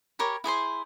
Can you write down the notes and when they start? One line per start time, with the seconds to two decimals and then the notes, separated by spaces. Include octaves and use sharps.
0.19 G4 A#4 C#5 B5
0.44 E4 G#4 C5 C6